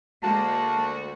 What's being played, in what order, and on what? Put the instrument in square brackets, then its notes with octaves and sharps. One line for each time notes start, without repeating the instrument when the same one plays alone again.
[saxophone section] D2 F#4 [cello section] G#3 A#3 [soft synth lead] A5